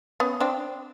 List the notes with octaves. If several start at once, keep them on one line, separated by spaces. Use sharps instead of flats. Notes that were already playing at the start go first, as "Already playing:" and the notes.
B3 C#4
C4 D4